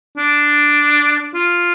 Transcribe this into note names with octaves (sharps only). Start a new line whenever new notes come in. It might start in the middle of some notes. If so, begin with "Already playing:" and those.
D4
F4